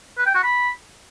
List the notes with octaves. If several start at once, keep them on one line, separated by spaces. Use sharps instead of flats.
B4
G5
F#4
B5